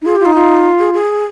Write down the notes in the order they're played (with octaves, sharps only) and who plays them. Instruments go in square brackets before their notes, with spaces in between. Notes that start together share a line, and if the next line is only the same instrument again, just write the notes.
[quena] D#4
[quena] F4 [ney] G#4
[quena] F4 [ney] G4
[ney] D#4
[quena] F4
[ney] G#4
G#4